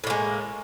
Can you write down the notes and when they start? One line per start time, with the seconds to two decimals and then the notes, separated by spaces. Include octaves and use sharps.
0.04 A2
0.07 A#3
0.10 G#3